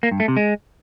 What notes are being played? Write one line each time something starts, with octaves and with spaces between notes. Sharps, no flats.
A#3
G2
A3
C3
G#3